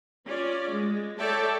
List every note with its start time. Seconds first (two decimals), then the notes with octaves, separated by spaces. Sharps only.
0.24 C#4 F4 D5
0.69 G#3
1.18 A4 C#5 D5 E5 G5 A5